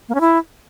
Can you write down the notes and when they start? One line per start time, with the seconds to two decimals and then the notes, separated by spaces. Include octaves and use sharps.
0.09 A#3
0.15 C#4
0.21 E4